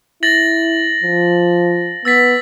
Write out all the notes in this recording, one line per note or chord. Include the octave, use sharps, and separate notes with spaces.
E4 A6 A#6 F#7
F3
B3 E6 A6 B6